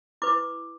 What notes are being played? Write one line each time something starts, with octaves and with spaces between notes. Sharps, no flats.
E4 B4 D6